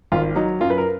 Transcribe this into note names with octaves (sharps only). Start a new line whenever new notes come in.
G#1 F4
F#3 D#4
F#2 F4
B4
A#4